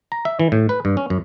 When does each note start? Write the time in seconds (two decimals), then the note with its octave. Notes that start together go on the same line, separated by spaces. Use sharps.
0.12 A#5
0.25 E5
0.39 E3
0.52 A2
0.69 B4
0.85 G2
0.97 C#4
1.10 F#2